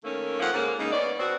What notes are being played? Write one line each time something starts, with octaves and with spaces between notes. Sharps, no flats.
D#3 A3 A#3 C#4
F2 F3 A#3 F#5
G#2 C#3 A3 A#3
C#3 G#3 A#3 D#4
B3 C#5 D5
B2 C4 F#4